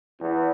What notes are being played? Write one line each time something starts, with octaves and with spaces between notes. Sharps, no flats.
E2